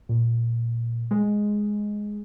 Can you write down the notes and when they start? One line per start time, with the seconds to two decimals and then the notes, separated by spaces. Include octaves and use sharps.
0.09 A#2
1.11 G#3